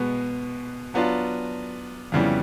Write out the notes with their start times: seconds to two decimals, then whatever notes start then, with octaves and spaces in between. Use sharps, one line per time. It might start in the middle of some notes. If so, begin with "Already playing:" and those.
Already playing: B2 G#3 B3
0.94 F#3 B3 D4 F4
2.12 F2 C#3 E3 G3 B3